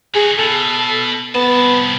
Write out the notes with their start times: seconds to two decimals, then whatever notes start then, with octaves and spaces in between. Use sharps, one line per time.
0.15 D#4 F#4 G#4
0.38 B2 A4
1.35 C2 B3 A5